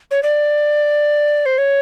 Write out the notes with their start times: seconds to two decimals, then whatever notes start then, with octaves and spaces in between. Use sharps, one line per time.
0.11 C#5
0.23 D5
1.46 C5
1.58 C#5